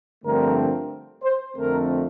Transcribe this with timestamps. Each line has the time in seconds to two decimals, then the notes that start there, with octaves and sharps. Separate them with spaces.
0.24 G2 D3 F3 A3 C4 A#4
1.23 C5
1.57 F2 D3 A3 C4 A#4